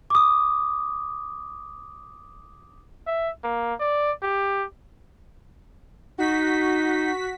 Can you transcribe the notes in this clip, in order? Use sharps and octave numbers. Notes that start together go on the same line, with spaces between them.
D6 D#6
E5
A#3
D5
G4
D#4 F#4 B6